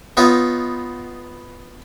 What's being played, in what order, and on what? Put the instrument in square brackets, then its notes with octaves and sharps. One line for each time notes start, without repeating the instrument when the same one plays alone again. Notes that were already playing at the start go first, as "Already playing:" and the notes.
[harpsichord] B3 D#4 F4 C#5